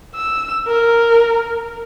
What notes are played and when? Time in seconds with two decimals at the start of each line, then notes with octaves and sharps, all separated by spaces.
0.15 E6
0.67 A#4